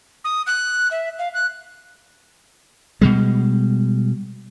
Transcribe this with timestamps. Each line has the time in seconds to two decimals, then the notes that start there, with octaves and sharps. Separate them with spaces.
0.24 D#6
0.47 F#6
0.91 E5
1.19 F5
1.34 F#6
3.01 B2 G3 G#3